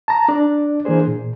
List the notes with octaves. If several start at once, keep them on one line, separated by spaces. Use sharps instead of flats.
A5 A#5
D4 D5
E3 A#3 D4 G#4 C5
A#2